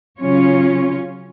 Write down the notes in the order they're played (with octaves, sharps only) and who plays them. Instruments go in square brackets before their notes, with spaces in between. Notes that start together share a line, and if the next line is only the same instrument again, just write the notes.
[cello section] C#3 F#3 C#4 F4 C#5